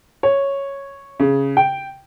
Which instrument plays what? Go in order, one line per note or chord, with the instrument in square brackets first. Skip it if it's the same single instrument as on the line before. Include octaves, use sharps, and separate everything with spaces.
[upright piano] C#5
C#3
G5